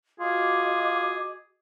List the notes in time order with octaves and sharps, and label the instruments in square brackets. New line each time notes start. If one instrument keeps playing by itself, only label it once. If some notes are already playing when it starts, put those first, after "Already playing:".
[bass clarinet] F4 [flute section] F#4 D#5 D6 [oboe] G#4